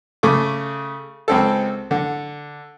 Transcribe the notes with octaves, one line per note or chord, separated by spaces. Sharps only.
C#3 A3 D6
C#2 C4 A4
D3